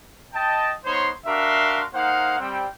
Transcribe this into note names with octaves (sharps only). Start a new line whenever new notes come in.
D#5 G5 A5
B3 D#4 C5 C#5 C6
D4 F#4 A#4 E5 F5 C6
A#3 D#4 C5 F5 F#5
G3 C4 G5